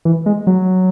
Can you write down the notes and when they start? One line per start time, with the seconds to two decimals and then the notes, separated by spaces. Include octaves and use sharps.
0.05 E3
0.26 G#3
0.47 F#3